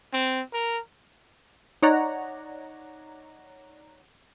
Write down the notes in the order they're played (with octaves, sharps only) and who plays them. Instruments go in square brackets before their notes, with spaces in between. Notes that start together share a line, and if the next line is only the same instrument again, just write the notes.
[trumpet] C4
A#4
[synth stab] D#4 C#5 D5 F#5 A#5